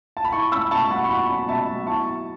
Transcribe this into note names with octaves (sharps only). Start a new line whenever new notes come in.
A5
B5
E4 A5 C#6
C#4 B5 E6
B2 A5 C#6
F#3 F#5 B5
C#6
E4 F#5 B5
C#4
B5
B2 E5 A5
F#3
E4 A5 C#6